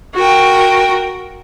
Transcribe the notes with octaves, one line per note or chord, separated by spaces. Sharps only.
F#4 A#4 G5